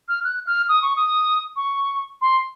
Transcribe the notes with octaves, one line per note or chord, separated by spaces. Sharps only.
F6
F#6
F6
D#6
C#6
D#6
C#6
C6